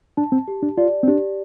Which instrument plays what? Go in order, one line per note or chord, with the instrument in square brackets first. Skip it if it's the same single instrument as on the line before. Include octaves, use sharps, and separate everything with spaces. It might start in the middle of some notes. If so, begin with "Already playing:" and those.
[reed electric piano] D4 [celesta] A5
[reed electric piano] C4
[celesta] G4
[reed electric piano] D4
[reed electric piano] F4 [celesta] D5
[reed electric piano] C4
[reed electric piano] D4 [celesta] G4